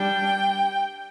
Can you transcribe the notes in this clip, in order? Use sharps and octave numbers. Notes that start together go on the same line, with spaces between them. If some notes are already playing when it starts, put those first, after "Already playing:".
Already playing: G3 D4 G5